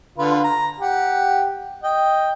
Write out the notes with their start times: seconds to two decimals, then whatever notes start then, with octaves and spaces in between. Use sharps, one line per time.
0.18 D3 F4 B4
0.44 A#5
0.80 G4 F#5
1.83 D#5 G5